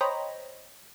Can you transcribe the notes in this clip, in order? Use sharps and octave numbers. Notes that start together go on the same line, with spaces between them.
C5 C#5 D#5 G5 A#5 B5